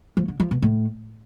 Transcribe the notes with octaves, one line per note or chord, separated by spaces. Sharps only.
F3
D3
F3
B2
A2